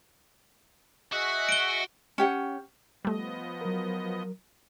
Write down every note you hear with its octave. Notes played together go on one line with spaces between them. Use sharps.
F#4 G#4 D#5 E5 F#6
D7 G7
C#4 G4 F#5
F3 G3 A3 B3 D#5
F#3 A#4